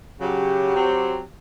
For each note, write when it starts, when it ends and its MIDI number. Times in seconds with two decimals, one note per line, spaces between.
0.21 0.73 49
0.21 0.73 54
0.21 1.25 67
0.75 1.20 54
0.75 1.20 60